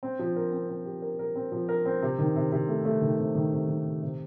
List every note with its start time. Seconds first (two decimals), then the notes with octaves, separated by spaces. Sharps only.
0.03 C4
0.19 F3
0.36 A#4
0.53 C4
0.69 C4
0.85 G4
1.02 A#4
1.19 A#4
1.36 C4
1.52 F3
1.69 A#4
1.86 C4
2.02 C3
2.19 D#3
2.36 C3
2.52 C3
2.68 A3
2.85 A3
3.02 D#3
3.19 C3
3.35 D#3
3.52 C3
3.68 D#3
3.85 C3
4.02 C3